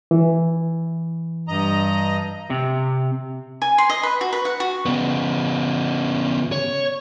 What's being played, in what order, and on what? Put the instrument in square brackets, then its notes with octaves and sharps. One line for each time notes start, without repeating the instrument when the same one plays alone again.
[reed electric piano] E3
[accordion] G2 D#5 A#5
[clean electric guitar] C3
[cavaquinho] G#5
C6
D#5
B4
F#4
B4
F#5
F#4
[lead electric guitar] C#3 B3
C#5